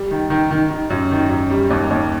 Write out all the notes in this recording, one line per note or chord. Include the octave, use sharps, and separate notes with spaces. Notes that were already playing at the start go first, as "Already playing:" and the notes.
Already playing: G3
D#3
D#3
D#3
D#3
F#2
D#3
F#2
G3
D#2
D#2